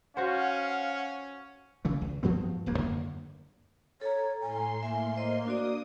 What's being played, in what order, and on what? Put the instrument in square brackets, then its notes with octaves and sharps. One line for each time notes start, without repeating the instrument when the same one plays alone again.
[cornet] C#4 [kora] F#4 C5 [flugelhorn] F5 [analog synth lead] F#5
[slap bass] C#3 E3 A3
C#2
G2 F3 B3 C4
D1 E2 A#3
F#2 D3 A#3
[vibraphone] A4 A#5 [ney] C#5
[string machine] A2 C6 [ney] G#5
[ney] A#3 [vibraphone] E5 G#5
[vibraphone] C5 D#5
[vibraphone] D4 F#4 D5 [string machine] D#6